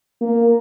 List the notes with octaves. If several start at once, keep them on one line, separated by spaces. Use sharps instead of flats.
A#3